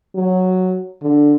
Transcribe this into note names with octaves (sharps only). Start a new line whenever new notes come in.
F#3
D3